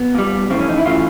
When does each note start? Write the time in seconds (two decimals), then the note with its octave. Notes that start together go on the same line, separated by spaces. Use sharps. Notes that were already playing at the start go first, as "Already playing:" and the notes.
Already playing: B3
0.15 A#2 G3
0.50 F2 C#3 E3 A3 C4
0.59 C#4
0.69 D#4
0.78 E4
0.86 C#3 E3 A3 F4